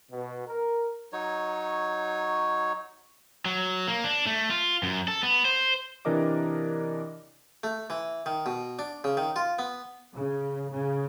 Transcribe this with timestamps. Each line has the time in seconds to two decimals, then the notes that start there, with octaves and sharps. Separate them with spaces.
0.11 B2
0.47 A#4
1.13 F#3 D#4 C#5
3.46 F#3
3.88 A#3
4.04 D4
4.26 A3
4.50 F4
4.83 F#2
5.08 A4
5.23 B3
5.45 C5
6.05 C3 E3 D4 A#4 D#5 D6
7.63 A3
7.90 E3
8.26 D#3
8.46 B2
8.79 D4
9.04 C#3
9.17 D#3
9.36 F4
9.59 B3
10.14 C#3
10.71 C#3